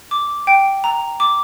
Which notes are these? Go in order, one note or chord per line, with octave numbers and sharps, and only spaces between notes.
D6
G5
A#5
D6